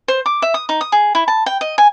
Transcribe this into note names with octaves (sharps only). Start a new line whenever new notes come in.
C5
D6
E5
D#6
D#4
D#6
G#4
E4
A5
G5
D#5
G#5